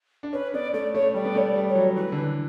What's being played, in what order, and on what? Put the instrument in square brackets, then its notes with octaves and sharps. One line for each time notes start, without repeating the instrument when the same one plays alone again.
[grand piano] D4
[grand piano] C#4 [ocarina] B4
[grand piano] B3 [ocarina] D5
[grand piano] A3 [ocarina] D5
[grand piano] A3 [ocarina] C#5
[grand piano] G3 [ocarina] D5
[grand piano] B3
[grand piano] A3 [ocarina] C#5
[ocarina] D5
[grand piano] G3
[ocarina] C#5
[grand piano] F#3
[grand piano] E3 [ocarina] B4
[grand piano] D3
E3